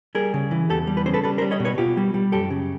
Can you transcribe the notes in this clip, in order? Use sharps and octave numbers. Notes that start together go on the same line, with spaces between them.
G3 G#4 A#4
C#3
E3
E2 G4 A4
G3
B4
C#3 C5
A4 B4
G3 A4 B4
A#4 C5
G3
C#5 D#5
B2
B4 C#5
B2 F4 G4
G3
G3
F#2 G4 A4
C#3